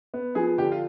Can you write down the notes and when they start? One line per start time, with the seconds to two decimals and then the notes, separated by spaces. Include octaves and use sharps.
0.14 B3
0.35 F3 G#4
0.58 D3 G4
0.72 F4